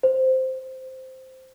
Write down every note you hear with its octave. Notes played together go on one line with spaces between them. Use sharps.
C5